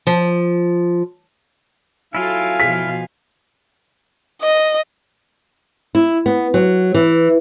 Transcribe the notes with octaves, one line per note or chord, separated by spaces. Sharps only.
F3
F#3 E4 F4 A4 F5 G#5
B2 F3 B6
D#5
E4
B3
F#3
E3